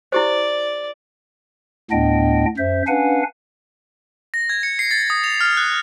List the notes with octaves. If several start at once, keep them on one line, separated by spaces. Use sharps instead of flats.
E4 G4 C5 D5
D2 A2 B3 D4 D#5 G5
F#2 C5 E5
C#4 D4 B4 F5 F#5 G#5
A#6
G#6
C#7
C7
A6
D#6
F7
F6
F#6